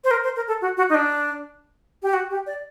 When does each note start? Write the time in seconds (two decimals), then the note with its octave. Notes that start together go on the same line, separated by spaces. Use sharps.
0.04 C5
0.11 A#4
0.24 C5
0.36 A#4
0.48 A4
0.62 F#4
0.77 F#4
0.90 D#4
0.95 D4
2.03 G4
2.13 F#4
2.30 G4
2.47 D5